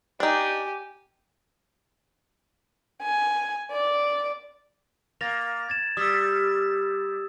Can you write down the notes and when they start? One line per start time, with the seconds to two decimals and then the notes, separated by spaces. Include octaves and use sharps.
0.20 D4 D#4 G4 G#5
3.02 G#5
3.72 D5
5.21 A#3 A6 A#6 F7
5.69 G#6 A6 E7
5.97 G3 D#6 E6